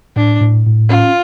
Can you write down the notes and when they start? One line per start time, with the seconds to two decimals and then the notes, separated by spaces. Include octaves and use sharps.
0.16 A2 D4
0.41 A2
0.66 A2
0.89 C#4 F4